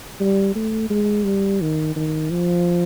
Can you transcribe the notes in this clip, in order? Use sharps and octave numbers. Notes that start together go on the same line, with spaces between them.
G3
A3
G#3
G3
D#3
D#3
F3